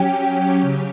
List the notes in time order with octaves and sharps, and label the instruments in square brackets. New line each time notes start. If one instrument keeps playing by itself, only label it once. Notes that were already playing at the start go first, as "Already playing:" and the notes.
Already playing: [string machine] F#3 C#4 G4 [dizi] G5
[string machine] C#3